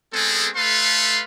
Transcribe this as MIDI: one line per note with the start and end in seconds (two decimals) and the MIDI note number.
0.14 0.49 56
0.14 0.49 59
0.14 0.49 60
0.14 0.49 68
0.14 0.49 69
0.56 1.23 57
0.56 1.23 69
0.56 1.23 71
0.56 1.23 77
0.56 1.23 84